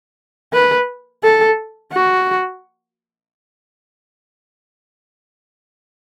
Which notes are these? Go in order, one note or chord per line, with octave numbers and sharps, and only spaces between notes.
B4
A4
F#4